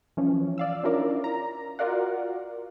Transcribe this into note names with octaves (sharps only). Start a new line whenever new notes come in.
E3 F3 C#4
D5 F5 E6
C#4 D4 E4 F4 A#4 D5
A#5
F4 F#4 A#4 D5 F5 F#5